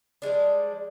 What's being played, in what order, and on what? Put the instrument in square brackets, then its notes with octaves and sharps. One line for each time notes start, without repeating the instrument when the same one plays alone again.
[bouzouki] F3 G3 G#3 D4